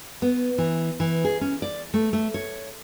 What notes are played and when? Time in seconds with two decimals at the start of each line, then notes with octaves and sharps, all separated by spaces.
0.22 B3
0.58 E3
1.00 E3
1.25 G#4
1.41 C#4
1.62 D5
1.94 A3
2.13 A3
2.34 C#5